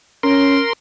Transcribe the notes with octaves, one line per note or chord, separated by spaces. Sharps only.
C#4 A#4 C6